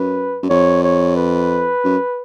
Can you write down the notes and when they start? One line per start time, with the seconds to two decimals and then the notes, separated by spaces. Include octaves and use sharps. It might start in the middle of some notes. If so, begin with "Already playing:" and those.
Already playing: F#2 B4
0.42 F#2
0.49 F2 C#5
0.84 C#5
1.17 B4
1.84 F#2